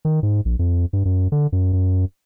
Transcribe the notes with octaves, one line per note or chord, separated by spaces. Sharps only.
D#3
G#2
A#1
F2
G2
F#2
D3
F#2
F#2